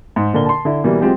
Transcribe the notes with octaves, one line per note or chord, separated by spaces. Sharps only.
G#2
A#2 D3 A#4 G7
A5 C6
D3 E4
B2 E3 G3 A#3
F#3 G#3 C4 F4 G4